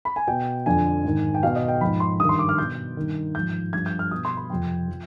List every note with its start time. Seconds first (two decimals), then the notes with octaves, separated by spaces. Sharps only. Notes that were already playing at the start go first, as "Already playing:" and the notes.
0.05 B5
0.16 G#5
0.27 B2 G5
0.66 F2 D3 F3 G#5
1.04 G#2 D#3
1.34 G5
1.43 B2 F5
1.56 D#5
1.68 G5
1.81 G#2 F3 B5
2.00 C6
2.20 G2 D#6
2.24 D#3
2.29 C6
2.39 D6
2.49 F6
2.58 B2 G6
2.97 G2 D#3
3.35 G#2 F3 G6
3.73 G2 F3 G#6
3.86 G6
3.99 F6
4.11 B2 D#6
4.25 C6
4.37 B5
4.50 F2 C3 F3 G5
4.88 F3